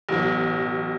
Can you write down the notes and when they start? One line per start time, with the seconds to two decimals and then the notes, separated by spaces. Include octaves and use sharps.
0.09 A1 B2 F#3